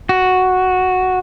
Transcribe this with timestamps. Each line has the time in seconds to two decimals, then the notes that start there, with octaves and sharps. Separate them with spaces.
0.09 F#4